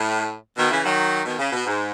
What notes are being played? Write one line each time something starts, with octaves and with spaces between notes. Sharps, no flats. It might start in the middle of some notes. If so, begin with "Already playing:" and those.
Already playing: A2
B2 D#3
C#3 E3
D#3 F#3
B2 D#3
C#3
B2
G#2